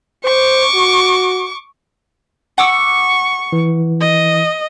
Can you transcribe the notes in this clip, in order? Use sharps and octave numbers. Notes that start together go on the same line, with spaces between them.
C5 C#6 D6
F#4
F#5 C#6 D6 E6
E3
D#5